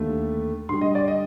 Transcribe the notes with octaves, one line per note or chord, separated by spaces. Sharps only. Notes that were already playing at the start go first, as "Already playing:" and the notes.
Already playing: D#2 D3 A3
G2 D3 G3 C6
D#5
D5
D#5